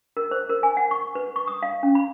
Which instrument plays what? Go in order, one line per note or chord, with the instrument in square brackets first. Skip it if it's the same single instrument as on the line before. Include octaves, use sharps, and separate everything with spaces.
[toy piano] A#4
C5
A#4
G#5
F#5
C#6
B4
C#6
D#6
F5
C#4
B5